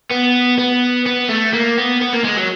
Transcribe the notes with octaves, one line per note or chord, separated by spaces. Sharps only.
B3
B3
B3
A3
A#3
B3
B3
A#3
G#3
F#3